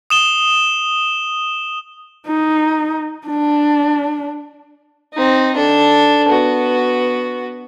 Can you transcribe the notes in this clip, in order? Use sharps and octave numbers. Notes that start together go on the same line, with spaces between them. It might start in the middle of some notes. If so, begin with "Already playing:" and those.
D#6 E7 G7
D#4
D4
C4 D#4
D4 A4
B3 F#4